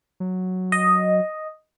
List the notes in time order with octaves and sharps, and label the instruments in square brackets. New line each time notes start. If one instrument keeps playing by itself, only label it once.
[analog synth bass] F#3
[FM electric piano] D#5